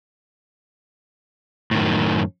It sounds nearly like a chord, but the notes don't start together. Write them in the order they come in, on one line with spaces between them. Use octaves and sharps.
A2 D#3 F#2